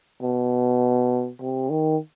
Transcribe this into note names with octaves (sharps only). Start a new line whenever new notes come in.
B2
C3
D#3